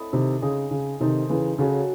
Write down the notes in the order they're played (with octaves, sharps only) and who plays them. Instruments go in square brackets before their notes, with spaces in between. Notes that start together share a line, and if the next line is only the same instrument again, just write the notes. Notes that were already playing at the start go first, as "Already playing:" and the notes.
Already playing: [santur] A3 C4 E4 A4 D#5
[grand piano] C3 D#3
[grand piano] C#3 [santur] G#3 D#4 G#4 D#5
[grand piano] C#3
[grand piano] C3 D#3 [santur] D#4 A4 C5
[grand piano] C#3 E3
[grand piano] C#3 [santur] F#3 C#4 F#4 A4